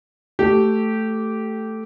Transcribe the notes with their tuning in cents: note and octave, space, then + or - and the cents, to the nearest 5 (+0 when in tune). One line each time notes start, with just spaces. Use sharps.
A3 +0 G4 -15